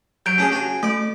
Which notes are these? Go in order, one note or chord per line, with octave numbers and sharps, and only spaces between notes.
F#3 G6 D7
C#4 D4 G#4
F#4 G#5
A3 D5